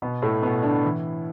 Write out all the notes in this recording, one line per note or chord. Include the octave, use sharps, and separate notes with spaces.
B2 B3
A2 A3
B2 B3
D3 D4
E3 E4